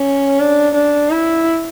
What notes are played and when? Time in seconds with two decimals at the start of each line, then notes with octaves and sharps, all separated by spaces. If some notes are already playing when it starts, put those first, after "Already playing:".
Already playing: C#4
0.40 D4
0.75 D4
1.10 E4